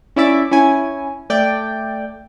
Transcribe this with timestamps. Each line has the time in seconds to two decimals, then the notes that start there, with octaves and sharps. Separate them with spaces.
0.16 C#4 E4 D5 E5 D6
0.51 C#4 E4 G#5
1.30 A3 D5 G5